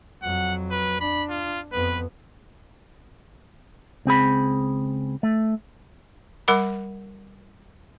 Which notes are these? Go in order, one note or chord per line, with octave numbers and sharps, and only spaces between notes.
F2 F#3 F#5
B4
D4 B5
F4
F2 B3 B4
C#2 C4 G#4 B5
A3
G3 A#4 F#5 B5 D6